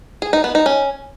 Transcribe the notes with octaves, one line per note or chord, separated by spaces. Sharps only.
G#4
D#4
B3
D#4
C#4